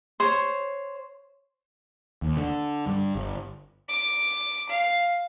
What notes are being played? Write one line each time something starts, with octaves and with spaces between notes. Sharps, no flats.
C5 C#5
D#2
D3
G2
G1
D6
F5